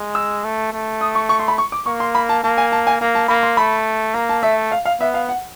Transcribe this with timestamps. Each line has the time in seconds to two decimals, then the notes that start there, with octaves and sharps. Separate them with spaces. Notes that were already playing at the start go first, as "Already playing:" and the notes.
Already playing: G#3
0.15 E6
0.44 A3
0.73 A3
1.01 D#6
1.15 C#6
1.29 C#6
1.39 C6
1.48 B5
1.58 C#6
1.72 D6
1.86 A#3 C#6
2.00 C6
2.15 B5
2.29 A5
2.43 A#3 A5
2.58 G#5
2.72 A5
2.87 G#5
3.00 A#3 A#5
3.15 A5
3.28 A#3 B5
3.43 C6
3.57 A3 B5
4.14 A#3 A#5
4.29 A5
4.43 A3 E5
4.72 F5
4.85 F5
5.00 B3 E5
5.14 F5
5.29 F#5